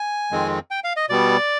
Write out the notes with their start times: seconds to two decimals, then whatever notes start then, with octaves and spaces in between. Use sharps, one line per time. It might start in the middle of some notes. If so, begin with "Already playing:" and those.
Already playing: G#5
0.31 F2 D#3 G#3 C4
0.71 G5
0.84 F5
0.97 D#5
1.10 B2 G3 B3 D5